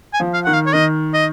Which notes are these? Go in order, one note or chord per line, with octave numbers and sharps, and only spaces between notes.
G#5
F3
F5
D#3 F#5
F5
C#5
D#3 D#5
D#5